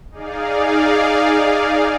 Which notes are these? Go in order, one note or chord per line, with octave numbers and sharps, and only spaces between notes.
D#4 G#4 D5 F5